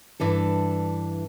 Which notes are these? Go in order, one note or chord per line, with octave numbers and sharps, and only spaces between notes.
G2 E3 D4 A4